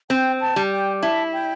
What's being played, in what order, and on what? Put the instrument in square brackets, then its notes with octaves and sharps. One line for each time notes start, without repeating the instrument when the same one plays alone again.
[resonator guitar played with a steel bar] C4 [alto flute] G5
[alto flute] A5
[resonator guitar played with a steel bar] G3
[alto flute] G5
[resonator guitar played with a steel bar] E4 [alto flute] A5
[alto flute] G5